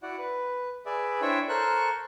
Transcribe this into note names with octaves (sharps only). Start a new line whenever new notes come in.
E4 F#4 D5 F#5
B4
G#4 B4 D5 E5
D4 E4 C5 C#5 E5 G5
A4 A#4 C5 C#6 F#6